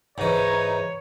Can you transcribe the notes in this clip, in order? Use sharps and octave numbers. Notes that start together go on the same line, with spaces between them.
G#2 E3 D#4 C#5